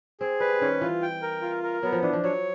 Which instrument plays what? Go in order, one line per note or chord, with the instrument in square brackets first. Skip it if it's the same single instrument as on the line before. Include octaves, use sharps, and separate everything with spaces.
[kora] C4 [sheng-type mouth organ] G#4
[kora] G3 [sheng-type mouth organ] B4
[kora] D#3 [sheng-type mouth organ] C#4
[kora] E3 [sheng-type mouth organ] F4
[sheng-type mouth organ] G5
A#4
F4
A#4
[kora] F#3 [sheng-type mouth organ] B3
[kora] F3
[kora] E3 [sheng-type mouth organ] D4
[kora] F3
[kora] F#3 [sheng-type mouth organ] C#5